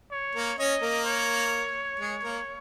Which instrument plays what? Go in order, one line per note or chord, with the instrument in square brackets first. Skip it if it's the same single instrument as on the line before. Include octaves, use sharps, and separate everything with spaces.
[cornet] C#5
[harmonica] A#3 A#4
[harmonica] C#4 C#5 [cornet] D#5
[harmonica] A#3 A#4
[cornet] C#5
[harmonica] G#3 G#4
A#3 A#4